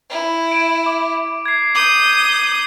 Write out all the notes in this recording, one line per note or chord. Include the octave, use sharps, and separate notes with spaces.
E4
D7 E7
D6
G#6 C7
D6 D#6 G6 F#7